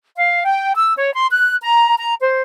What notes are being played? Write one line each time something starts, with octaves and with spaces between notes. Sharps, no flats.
F5
G5
E6
C#5
C6
F#6
A#5
A#5
C5